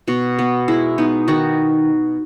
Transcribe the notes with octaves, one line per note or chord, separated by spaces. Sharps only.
B2 F#4
B3
G#3 E4
B3 D#4
D#3 F#4